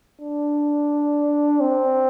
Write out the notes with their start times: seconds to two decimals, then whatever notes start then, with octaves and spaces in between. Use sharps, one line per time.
0.21 D4
1.60 C4